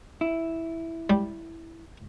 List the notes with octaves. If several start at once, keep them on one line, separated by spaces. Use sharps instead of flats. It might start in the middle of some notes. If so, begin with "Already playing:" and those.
E4
G3